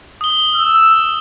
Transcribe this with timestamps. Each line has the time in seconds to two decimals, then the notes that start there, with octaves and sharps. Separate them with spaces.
0.21 D#6 G7
0.55 E6